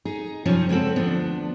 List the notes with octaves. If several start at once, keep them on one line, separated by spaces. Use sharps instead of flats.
D#4 G#4
F#2 C3 F3 C#4 D#4
C#3 G#3 B3 C4 A4
D2 F3 B3 D4